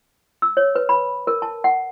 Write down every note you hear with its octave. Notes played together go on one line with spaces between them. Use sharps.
E6
C#5
B4
B5
A#4
A5
F#5